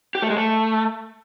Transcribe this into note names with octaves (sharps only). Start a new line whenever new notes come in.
G4
A3
G#3
A3